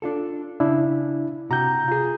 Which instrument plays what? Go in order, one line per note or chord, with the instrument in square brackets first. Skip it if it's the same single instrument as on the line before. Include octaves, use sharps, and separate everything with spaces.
[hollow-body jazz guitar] D4 F4 A4
[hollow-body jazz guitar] C#3 [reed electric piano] D4 E4
[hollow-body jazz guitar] C3 F#4 [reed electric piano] A#5 G6
[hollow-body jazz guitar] F4 G#4